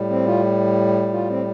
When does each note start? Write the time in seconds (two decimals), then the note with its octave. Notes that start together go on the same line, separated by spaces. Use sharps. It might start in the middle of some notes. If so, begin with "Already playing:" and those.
Already playing: A2 G3
0.10 C4
0.26 F4
1.13 F4
1.30 C4